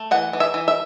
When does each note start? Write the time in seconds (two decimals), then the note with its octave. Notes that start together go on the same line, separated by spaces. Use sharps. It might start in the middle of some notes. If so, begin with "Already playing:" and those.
Already playing: A3
0.11 E3 F#5
0.33 E3
0.40 E5
0.54 E3
0.68 E5